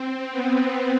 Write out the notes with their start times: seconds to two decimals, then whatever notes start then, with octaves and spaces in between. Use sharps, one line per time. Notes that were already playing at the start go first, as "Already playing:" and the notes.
Already playing: C4
0.32 B3